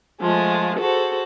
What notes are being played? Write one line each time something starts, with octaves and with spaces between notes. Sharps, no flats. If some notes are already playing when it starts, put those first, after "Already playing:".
F3 G#3 A3 F4
F#4 G#4 A4 C5